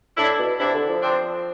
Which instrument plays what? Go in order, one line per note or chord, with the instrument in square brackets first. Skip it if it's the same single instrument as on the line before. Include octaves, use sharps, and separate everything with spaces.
[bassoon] A2 [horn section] D4 E4
[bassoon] B2
[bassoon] C3 [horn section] D4 E4
[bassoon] D3
F3
[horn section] C4 D4